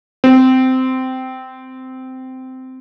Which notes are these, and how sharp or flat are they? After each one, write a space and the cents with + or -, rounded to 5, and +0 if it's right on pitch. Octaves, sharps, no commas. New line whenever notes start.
C4 -15